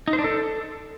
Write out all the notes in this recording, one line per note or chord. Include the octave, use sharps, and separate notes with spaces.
D#4
C5
D4
A4